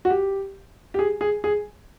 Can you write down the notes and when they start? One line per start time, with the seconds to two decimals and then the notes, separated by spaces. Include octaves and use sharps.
0.05 F#4
0.10 G4
0.94 G4
0.99 G#4
1.21 G#4
1.44 G#4